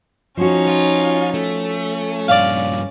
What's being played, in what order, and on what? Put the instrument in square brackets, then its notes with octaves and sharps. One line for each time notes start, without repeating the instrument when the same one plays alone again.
[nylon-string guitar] F3 F#4 [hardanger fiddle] C#4 D#4
[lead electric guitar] F4
[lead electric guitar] A3 [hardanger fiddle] C#4
[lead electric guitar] G2 A#2 [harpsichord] D5 F5